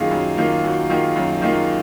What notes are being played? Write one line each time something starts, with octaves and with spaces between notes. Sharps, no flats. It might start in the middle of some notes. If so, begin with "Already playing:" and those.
Already playing: F#2 D#3 A#3 F4 G#4
F#2
D#3 A#3 F4
F#2 F#4
D#3 A#3 F4
F#2
D#3 A#3 F4